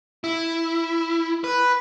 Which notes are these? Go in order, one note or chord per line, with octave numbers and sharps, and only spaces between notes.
E4
B4